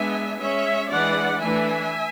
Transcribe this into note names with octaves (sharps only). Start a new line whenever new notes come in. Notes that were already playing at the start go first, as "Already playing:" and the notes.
Already playing: G#3 B3 D4 E5 G#5
G#3 C#4 C#5 E5
E3 G#3 D4 D5 F#5
E3 A3 D4 E5 G#5